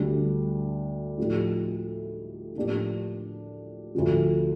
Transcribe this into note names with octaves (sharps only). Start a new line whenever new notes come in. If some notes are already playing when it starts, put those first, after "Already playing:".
Already playing: D2 D3 G3 D4
A2 F3 A3 D#4 G4
A2 F3 A#3 D4 G4
D2 D3 F3